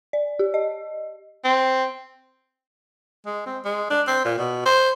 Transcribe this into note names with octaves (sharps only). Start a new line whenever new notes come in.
D5
G4
D#5
C4
G#3
C4
G#3
D4
C4
A#2
B2
C5